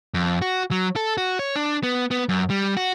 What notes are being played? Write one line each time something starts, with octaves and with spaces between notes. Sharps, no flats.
F2
F#4
F#3
A4
F#4
C#5
D4
B3
B3
F#2
G3
F#4